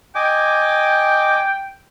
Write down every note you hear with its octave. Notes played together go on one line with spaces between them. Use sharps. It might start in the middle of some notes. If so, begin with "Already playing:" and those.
D#5 G5 G#5 D6